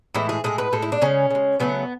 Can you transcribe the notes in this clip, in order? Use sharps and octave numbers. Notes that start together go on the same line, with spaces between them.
A2 E3 G#3 E4
G#4
A2 G#3 G#4
B4
A2 G#3 A4
E4
D4
C#3 G#3 C#4
C#3 G#3
C#3 F#3 A3 B3